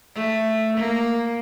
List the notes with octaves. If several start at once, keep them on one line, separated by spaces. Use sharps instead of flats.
A3
A#3